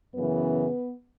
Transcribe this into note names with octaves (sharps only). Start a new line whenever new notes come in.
F#2 C#3 E3 B3 B4